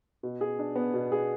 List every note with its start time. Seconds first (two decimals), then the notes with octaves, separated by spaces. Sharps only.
0.23 B2
0.41 G#4
0.59 D4
0.75 B3
0.94 B2
1.12 G#4